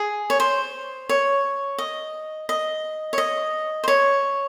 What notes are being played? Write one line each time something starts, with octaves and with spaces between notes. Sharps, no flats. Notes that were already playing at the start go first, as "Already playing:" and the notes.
Already playing: G#4
C#5
C5
C#5
D#5
D#5
C#5
D#5
C5
C#5